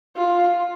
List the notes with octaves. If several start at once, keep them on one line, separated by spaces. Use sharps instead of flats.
F4